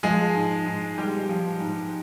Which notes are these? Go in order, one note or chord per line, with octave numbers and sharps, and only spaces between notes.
F3 G#3 G#4
G#2
G#2
G3 G#3 G4
F3
G#2